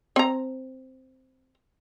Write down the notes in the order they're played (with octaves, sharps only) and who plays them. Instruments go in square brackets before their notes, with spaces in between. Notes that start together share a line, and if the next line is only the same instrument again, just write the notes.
[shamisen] C4 A#5